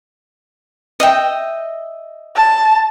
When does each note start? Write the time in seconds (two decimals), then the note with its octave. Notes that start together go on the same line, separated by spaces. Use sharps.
1.00 D#5 E5 G5
2.36 A5